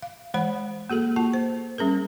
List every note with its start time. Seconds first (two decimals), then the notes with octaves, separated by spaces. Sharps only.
0.02 F5
0.34 E3 G#3 C5 F#5 B5
0.90 A#3 F#4 G#4 A4
1.16 A#3 F4 A5
1.34 C5
1.78 G3 C#4 G#4 A#4